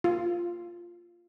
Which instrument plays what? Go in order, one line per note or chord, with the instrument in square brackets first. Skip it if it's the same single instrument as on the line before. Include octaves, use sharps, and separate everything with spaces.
[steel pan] F4